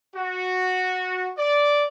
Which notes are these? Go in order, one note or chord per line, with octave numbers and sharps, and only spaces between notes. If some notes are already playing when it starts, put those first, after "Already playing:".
F#4
D5